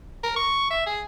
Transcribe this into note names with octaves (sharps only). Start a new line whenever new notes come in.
A#4
C#6
E5
G#4